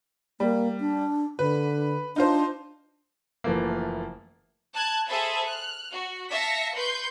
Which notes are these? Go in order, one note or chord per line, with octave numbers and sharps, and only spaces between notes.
G3 A#3
D4
D3 B4
D4 D#4 F4 C5
F#1 E3 F3 A3 A#3
A5 F#6 G#6
G#4 A4 C5 E5 A5 B5
F6 F#6
F#4
E5 F5 A5 A#6 B6 C#7
B4 C6 C#6 G6 C7